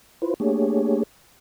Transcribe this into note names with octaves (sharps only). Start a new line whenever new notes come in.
E4 F4 B4 C5
A3 A#3 D4 G4 G#4 C#5